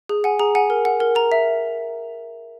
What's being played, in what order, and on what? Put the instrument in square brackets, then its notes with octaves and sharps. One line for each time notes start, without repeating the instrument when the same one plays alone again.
[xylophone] G#4
F#5 G#5
G#4 A#5
F#5 G#5
A#4
F#5
A#4
A#4 A#5
E5